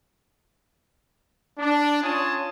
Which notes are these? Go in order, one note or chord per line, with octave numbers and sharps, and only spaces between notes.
D4
C#4 F4 C#5 G#5 A5 D#6